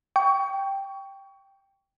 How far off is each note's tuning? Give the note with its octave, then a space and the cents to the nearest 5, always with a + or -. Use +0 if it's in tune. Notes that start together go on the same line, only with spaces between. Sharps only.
G5 +0 C#6 +25